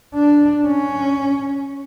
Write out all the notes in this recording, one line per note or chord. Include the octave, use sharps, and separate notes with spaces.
D4
C#4